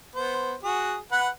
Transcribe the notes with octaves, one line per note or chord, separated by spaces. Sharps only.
B3 C5
F#4 G#4
B4 F#5